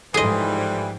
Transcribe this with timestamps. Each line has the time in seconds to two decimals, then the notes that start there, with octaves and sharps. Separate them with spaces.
0.14 G#2 E3 F3 G3 G#4 A4 D#5 C6